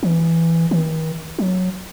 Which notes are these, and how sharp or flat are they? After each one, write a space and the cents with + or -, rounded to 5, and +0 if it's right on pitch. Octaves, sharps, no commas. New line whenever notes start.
E3 +5
D#3 +45
F#3 -10